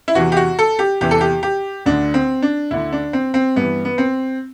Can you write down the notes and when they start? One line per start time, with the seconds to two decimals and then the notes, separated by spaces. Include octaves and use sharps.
0.08 E4
0.15 E2 C3 E3 F#4
0.32 G4
0.37 F#4
0.59 A4
0.79 G4
1.01 E2 C3 E3 G4
1.11 A4
1.21 G4
1.43 G4
1.86 D2 D3 D4
2.14 C4
2.42 D4
2.71 D2 D3 E4
2.93 D4
3.13 C4
3.34 C4
3.56 G2 E3 B3
3.85 B3
3.98 C4